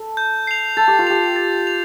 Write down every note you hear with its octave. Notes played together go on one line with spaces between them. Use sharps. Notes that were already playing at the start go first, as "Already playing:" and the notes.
Already playing: A4
G6
C7 F7
A4 A6
G4
F4
G4 F7
A6
F7